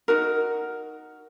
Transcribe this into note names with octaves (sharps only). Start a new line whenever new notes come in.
D#4 F#4 A#4